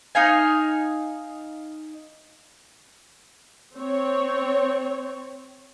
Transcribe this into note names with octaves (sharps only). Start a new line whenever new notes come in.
D#4 F5 G#5
C4 C#5